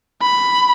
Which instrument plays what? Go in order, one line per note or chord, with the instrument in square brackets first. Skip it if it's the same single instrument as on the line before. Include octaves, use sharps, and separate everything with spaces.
[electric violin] B5